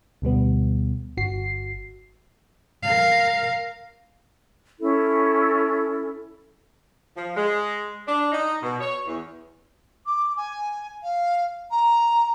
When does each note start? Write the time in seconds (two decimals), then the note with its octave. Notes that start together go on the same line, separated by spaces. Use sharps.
0.22 D2 B2 G3 B3
1.17 G1 F#4 C7
2.83 A#4 F5
4.81 C#4 E4 A4
7.17 F3
7.37 G#3
8.08 D4
8.32 D#4
8.63 B2
8.81 C#5
9.06 E2
10.06 D6
10.36 G#5
11.02 F5
11.70 A#5